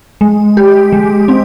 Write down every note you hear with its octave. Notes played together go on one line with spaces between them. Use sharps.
G#3
G4
G#3
C4